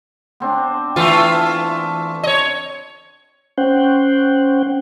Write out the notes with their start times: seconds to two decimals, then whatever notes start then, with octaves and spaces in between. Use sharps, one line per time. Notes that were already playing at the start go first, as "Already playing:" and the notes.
0.40 B3 C4 D4
0.96 E3 A3 F4
2.23 C#5 D#5
3.58 C#4 C5 F#5 G5